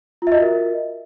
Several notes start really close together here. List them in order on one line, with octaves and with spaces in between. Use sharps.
F4 E5 D#5 F#4 A#4